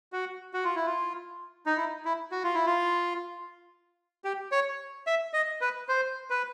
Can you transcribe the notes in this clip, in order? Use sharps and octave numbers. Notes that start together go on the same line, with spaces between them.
F#4
F#4
F4
E4
F4
D#4
E4
E4
F#4
F4
E4
F4
G4
C#5
E5
D#5
B4
C5
B4